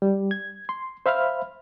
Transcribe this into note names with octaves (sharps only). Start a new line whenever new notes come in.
G3
G#6
C6
C5 E5 F5 B5 F6